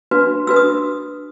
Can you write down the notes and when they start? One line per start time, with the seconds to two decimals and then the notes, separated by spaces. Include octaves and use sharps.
0.11 D4 F#4 B4
0.47 D4 F#4 B4 E6
0.56 D#6